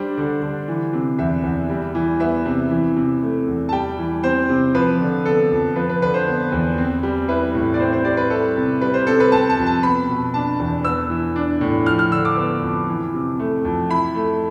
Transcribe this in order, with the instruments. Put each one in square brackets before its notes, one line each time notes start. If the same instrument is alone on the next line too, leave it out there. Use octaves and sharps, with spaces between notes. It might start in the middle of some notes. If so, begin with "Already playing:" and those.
Already playing: [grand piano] G3 D4 C5
D3
D3
E3
C3
E2 E5
E2
G3
E3
B3 E5
C3
E3
C3
A3
E2
A5
G3 G5
E3
C4 C5
C3
F3 B4
D3
B3 A4
F2
F3 B4
B4
D3 B4
C5
B3
E2
C4
G3
E4 B4
A2
D5
C4 C5
C5
G3 D5
B4
E4 A4
C3
G3 B4
C5
C3 A4
B4
C4 A5
A5
F2
A5
B3 B5
B2
D4 A5
E2
B3 E6
E3
D4
A2
F3 F6
F6
D3 E6
D6
B3
F2
E3
C3
A3
F2
E4 B5
A3